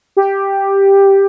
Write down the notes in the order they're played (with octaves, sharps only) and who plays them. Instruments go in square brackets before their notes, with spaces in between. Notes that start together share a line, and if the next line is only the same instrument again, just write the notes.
[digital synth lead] G4